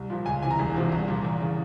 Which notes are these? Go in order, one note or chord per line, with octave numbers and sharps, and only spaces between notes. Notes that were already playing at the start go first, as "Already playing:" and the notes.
Already playing: C2
A#2 F3
C#2 G#5
C3 E3 G#5
A#5
E1
E2 C3 F3
C2
A#2 F3
E2 A#5
C#3 E3